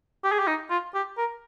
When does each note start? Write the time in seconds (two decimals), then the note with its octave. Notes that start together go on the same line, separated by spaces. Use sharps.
0.24 G4
0.32 G#4
0.39 G4
0.48 D#4
0.70 F4
0.94 G4
1.18 A#4